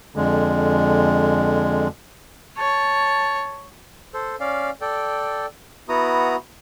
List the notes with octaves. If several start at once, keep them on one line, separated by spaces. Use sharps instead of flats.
F2 D3 G#3
C#5 A5
A4 C5
C#4 D5 F5
A4 D5 G5
B3 E4 F#4 A#5 D#6